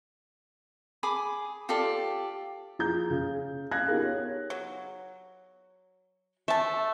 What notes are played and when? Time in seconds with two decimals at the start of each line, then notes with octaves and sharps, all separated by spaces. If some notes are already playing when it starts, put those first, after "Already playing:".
1.03 G#4 G#5 B5 D6
1.69 F4 G4 A4 D5
2.79 F3 G#4 A#5 G6
3.10 C#3
3.72 F5 F#6 G#6 A#6
3.88 B3 D#4 F4 G4 G#4 A#4
4.02 C#5
4.50 F#3
6.48 A3 E5 A5